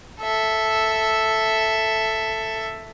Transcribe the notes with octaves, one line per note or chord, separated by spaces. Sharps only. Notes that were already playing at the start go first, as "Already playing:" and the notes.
A4 E5